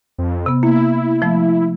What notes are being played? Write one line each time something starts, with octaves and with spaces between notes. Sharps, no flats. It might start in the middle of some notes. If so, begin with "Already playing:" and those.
F2
C3 B3
A#3 E4
F3 A3